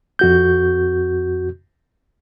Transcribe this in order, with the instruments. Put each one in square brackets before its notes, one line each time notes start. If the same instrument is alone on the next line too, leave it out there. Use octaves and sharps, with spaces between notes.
[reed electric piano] F2 F#4 G6